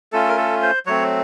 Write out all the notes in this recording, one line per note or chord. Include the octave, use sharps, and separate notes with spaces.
A3 C#4 F4 A4
A#4
A4
C5
F#3 A3 C4 C#5